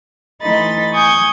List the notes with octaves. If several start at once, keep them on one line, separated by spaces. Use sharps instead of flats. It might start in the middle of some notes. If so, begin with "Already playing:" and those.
E3 A3 D#4 B5 C6 A6
G#5 C#6 D#6 G6 G#6